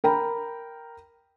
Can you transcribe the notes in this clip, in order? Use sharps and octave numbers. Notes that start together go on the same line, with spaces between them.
A#4 G5 A#5 B5